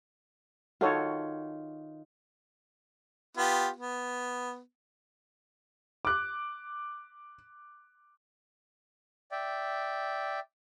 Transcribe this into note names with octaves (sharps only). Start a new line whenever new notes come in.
D#3 F4 F#4 A4 C#5
B3 F4 G4
B3
D6 F#6
D5 E5 G5